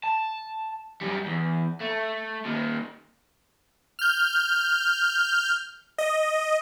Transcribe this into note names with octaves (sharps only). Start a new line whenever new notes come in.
A5
F#2 G3
E2
A3
A#2 D#3
F6 G6
D#5